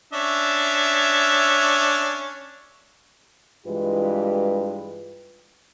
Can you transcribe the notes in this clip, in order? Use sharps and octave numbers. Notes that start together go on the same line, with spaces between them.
C#4 D4 E5
G2 E3 G#3 F4 G4 B4